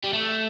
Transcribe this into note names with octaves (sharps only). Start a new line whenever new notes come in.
G3
A3